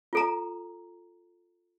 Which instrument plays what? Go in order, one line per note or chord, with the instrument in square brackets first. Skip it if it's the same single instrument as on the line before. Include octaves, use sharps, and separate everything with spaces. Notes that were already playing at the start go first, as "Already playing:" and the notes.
[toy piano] F4 A4 A#5